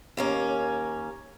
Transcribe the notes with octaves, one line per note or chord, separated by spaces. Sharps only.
D#2 A#3 C#4